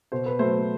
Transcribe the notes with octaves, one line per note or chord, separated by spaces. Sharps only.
B2 C5
B4
F#3 A3 C5